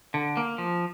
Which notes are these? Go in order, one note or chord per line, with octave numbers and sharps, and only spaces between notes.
D3
A#3
F3